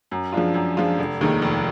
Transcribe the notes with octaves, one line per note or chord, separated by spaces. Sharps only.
F#2
F3 G#3 D4 F4
F#2
F3 G#3 D4 F4
F1
D#2 D#3 G#3 D#4
F1